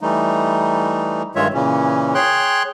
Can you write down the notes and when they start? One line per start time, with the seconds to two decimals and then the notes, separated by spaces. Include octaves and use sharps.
0.01 E3 G3 A3 D#4
1.35 G2 D#3 G#3 F4 C#5 E5
1.54 A#2 C#3 E3 C#4
2.14 G#4 C#5 G5 C6 F#6